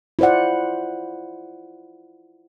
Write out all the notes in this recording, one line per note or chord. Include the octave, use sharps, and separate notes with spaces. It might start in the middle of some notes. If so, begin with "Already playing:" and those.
E4 F4 C5 D5 F#5